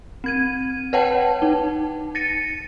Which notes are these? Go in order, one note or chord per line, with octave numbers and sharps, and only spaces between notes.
C4 G#6 D#7
B4 C#5 F#5 G5 A5
D#4
A6 A#6 C#7 D#7